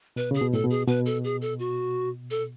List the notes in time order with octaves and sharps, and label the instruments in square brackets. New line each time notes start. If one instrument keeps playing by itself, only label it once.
[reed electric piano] B2 [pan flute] B4
[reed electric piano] C#3 [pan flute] G#4
[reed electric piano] B2
[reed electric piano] A2 [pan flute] A4
[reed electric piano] B2
[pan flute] G#4
[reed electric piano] B2 [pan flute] B4
[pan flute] A4
G#4
A4
F#4
A4